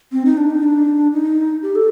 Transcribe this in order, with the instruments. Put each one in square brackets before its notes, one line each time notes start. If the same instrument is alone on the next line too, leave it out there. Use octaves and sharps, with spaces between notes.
[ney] C4
D#4
D4
D#4
D4
D#4
G4
A4